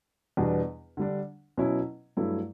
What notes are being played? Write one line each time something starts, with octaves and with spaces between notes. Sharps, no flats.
E2 B2 G3 B3 D4
D3 G3 D4
B2 F#3 C#4 E4
G2 F#3 A3 E4